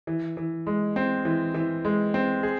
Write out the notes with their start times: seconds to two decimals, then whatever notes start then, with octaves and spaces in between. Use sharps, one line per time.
0.07 E3
0.37 E3
0.67 G#3
0.96 C4
1.25 E3
1.54 E3
1.85 G#3
2.14 C4
2.43 G#4